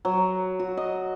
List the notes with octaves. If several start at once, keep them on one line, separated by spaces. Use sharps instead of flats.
F#3
F#4
D#5